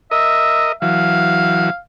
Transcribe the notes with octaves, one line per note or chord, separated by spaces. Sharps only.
A#4 D#5 E5
E3 F#3 F5